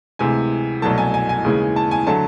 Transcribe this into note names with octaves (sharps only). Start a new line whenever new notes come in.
D2 C3 E3 G#3 G#5
C2 B2 F#3 A3 A5
G#5
G#5
G#5
D#2 C#3 E3 G#3
A5
G#5
D3 F#3 A3 A5